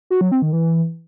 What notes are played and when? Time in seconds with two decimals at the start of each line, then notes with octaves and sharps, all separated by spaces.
0.10 F#4
0.21 F#3
0.32 C4
0.42 D#3
0.53 E3